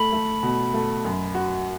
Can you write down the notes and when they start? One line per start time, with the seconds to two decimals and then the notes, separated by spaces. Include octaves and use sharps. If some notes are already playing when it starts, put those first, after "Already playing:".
Already playing: A3 B5
0.13 A3
0.43 B2
0.74 A3
1.05 F#2
1.35 F#4